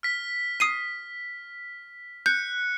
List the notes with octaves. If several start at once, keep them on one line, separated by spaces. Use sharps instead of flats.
F6 B6
D#6 C7 D#7
F#6 G6 C#7